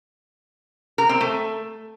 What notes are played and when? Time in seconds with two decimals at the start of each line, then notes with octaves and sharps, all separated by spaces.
0.98 A#4
1.09 C4
1.21 A3